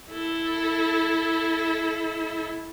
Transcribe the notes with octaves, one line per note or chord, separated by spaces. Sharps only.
E4 A4